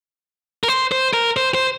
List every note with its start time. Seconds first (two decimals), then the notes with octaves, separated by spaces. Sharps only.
0.64 A#4
0.68 C5
0.92 C5
1.13 A#4
1.37 C5
1.54 C5